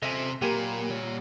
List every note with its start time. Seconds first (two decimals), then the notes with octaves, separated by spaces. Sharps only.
0.03 C3 A4 C5 D#5 E5 G#5
0.42 A#2 F#3 A#3 G4 A#4 G#5 B5
0.90 G3 C#5